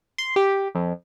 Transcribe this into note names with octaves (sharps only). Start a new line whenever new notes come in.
C6
G4
F2